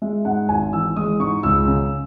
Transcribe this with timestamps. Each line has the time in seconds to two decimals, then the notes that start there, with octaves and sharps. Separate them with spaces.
0.02 G#3 E5
0.25 G#2 F#5
0.49 G#1 G#5
0.73 E3 E6
0.96 G#3 D#6
1.20 G#2 C#6
1.43 C#2 E6
1.67 C#3